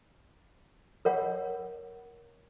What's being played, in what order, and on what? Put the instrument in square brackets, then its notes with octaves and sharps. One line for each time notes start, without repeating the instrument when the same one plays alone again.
[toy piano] A#4 C#5 F#5